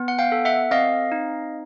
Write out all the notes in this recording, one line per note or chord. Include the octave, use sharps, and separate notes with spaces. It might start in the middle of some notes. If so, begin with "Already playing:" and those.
Already playing: B3
F#5
F5 G5
A4
E5 F#5
C4 D#5 F5
D#4